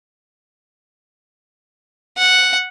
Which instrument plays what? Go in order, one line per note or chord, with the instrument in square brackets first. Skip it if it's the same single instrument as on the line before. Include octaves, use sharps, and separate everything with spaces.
[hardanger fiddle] F#5